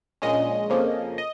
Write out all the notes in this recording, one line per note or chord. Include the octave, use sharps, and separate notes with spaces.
A#1 A#2 G#3 C#4 D#5
F2 C#3 F3 A#3 C#4
D#5